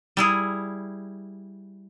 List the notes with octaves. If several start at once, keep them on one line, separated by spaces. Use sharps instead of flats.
G3 E4 G#4